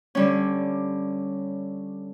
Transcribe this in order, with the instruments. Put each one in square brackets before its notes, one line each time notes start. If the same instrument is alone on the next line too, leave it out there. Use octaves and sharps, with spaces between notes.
[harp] D3 G3 C#4